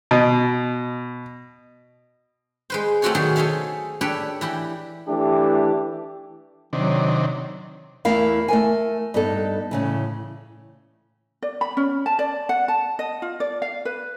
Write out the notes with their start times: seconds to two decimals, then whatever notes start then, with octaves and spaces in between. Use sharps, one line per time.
0.11 B2
2.70 G#3 B4 C5
3.02 A3 C4 F4 F#4 A4 C#5
3.15 B2 D#3 F#3 A3 G#4
3.36 G#4 A4 C5 C#5 E5 F5
4.01 D4 G4 A4 B4 C#5 D5
4.41 E3 E4 G4
5.07 E3 A3 D4 G4
6.73 C3 D#3 F#3 D4
8.05 E2 A3 E4 A#4 F5
8.48 A3 A#4 G#5
9.14 G2 B3 D#4 A4
9.71 A2 C#3 E3
11.42 D5
11.61 B5
11.77 C#4
12.06 A5
12.19 D5
12.49 F#5
12.68 A5
12.99 D#5
13.22 F4
13.40 D5
13.62 F5
13.85 B4